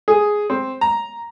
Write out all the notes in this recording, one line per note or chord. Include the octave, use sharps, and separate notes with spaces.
G#4
C4
A#5